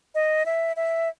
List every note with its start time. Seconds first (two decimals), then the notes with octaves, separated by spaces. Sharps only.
0.15 D#5
0.46 E5
0.76 E5